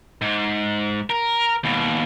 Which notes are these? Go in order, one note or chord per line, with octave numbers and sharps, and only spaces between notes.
G#2
A#4
D#2 B2